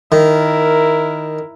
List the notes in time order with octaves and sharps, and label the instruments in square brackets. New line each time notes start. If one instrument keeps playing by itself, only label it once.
[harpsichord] D#3 [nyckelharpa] E4 A#4